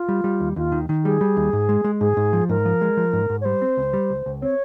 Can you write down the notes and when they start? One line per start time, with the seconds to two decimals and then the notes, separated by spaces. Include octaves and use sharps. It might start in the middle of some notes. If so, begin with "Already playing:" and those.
Already playing: F4
0.09 G3
0.24 G3
0.40 D#2
0.56 D#2 F4
0.72 D#3
0.89 D#3
1.04 G3 G#4
1.21 G3
1.37 D#2
1.53 G#2
1.69 G#3
1.84 G#3
2.01 G#2 G#4
2.17 G#2
2.33 F3
2.49 G#2 A#4
2.65 F3
2.81 G#3
2.97 F3
3.13 G#2
3.30 G#2
3.41 C#5
3.45 G3 C5
3.62 C4
3.77 C#2
3.93 G3
4.10 C#2
4.26 C#2
4.42 C4 C#5